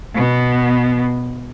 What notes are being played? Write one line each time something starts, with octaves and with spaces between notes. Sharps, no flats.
B2 B3